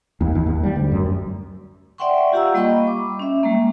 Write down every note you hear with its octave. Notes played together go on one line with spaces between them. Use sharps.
D#2
D#2
D#2
G3
D2
F#2
D5 E5 F#5 G5 C6 C#6
F4 G4 F5 F#5 A#5 E6
G3 A#3 D#5 G5 B5 C#6
D6
C#4 E5
G3 G#3 A#3